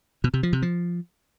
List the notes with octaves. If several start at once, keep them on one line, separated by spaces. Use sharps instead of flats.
B2
C3
F3
C3
F3